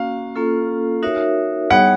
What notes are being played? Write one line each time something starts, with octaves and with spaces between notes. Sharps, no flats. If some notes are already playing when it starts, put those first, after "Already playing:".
Already playing: A#3 C#4 F#4 F5
A#3 C#4 F4 A4
D#4 F#4 A#4 C#5 E5
G3 B3 D#4 G#4 C#5 F#5